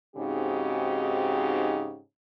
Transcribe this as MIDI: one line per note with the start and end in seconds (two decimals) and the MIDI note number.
0.16 1.99 44
0.16 1.99 49
0.16 1.99 60
0.16 1.99 63
0.16 1.99 66
0.16 1.99 67